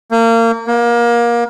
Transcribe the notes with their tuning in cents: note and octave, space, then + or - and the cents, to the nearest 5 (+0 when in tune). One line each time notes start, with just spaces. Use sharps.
A#3 -30
A#3 +25